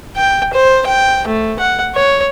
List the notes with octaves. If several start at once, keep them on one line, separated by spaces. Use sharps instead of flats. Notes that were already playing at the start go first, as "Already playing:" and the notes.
G5
C5
G5
A3
F#5
C#5